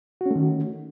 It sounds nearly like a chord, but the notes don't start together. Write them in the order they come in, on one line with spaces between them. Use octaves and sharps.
F#4 C#4 A3 D#3